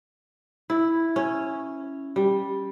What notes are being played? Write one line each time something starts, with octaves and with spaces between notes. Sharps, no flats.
E4
C#4
G3